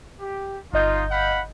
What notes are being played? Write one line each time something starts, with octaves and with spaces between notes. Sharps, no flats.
G4
G1 D#4 F4 D#5 G6
F5 F#5 B5